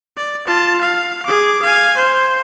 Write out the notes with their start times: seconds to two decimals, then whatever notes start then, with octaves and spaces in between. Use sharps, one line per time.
0.17 D5
0.47 F4 A5
0.81 F5
1.26 G#4 D6
1.62 F5 G#5
1.97 C5